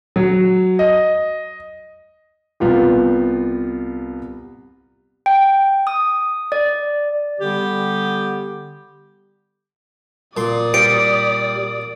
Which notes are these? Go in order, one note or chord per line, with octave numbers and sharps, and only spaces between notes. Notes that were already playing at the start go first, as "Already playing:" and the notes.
F#3
D#5
C2 B3 F4 G4
G5
D#6
D5
D3 G3 B3 G4
A#2 D5 C6 D#6
G3 D7